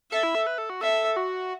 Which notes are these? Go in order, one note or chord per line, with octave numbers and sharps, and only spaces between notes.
A4 E5
E4
A4
B4
A4
F#4
A4 E5
F#4